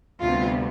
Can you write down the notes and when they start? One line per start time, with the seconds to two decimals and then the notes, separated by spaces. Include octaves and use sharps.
0.22 D2 C3 G3 B3 F4